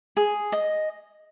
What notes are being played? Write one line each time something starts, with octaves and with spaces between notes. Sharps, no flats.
G#4
D#5